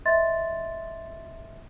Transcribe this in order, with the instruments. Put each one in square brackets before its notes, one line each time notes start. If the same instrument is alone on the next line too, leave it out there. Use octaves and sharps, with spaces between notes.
[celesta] D#5 E5 C6 A6